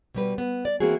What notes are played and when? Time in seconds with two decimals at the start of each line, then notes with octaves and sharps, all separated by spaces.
0.14 B2 G3 B4
0.38 B3
0.65 D5
0.80 E3 A#3 C4 F#4 G#4